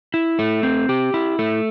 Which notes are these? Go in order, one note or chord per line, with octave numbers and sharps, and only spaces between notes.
E4
A3
C4
G4
E4
A3